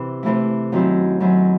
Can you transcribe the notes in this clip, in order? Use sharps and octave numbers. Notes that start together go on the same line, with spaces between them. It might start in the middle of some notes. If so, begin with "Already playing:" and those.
Already playing: C3 E3
C3 E3 A3 E4
F#2 D#3 F#3 C4 E4
F#2 D#3 F#3 C4 E4